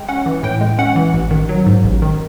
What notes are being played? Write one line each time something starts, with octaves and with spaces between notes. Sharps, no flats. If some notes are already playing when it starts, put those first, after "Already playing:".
Already playing: G#3 G5
C#4 F#5
E3
A2 G5
G#3
C#4 F#5
E3
A1
D#3
F#3
G#2
A1
D#3